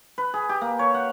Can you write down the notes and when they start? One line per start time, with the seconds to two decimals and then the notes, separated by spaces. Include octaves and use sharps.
0.18 B4
0.34 G#4
0.49 G4
0.61 A#3
0.79 C#5
0.94 F#5